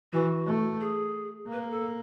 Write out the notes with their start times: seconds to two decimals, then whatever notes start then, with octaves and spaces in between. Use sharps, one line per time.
0.13 E3 F#4
0.47 A3
0.81 G#4
1.48 A#3 B4
1.62 A#4
1.70 A4